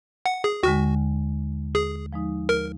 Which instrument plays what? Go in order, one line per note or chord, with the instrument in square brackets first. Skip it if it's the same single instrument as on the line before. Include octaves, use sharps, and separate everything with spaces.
[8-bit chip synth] F#5
G#4
[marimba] D#2 D3 G#3 [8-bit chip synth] F#4
[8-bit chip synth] G#4
[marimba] F3 G#3 D#4
[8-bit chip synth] A#4